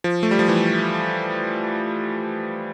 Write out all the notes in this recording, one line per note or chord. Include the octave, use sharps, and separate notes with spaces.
F3
A3
G3
F3
E3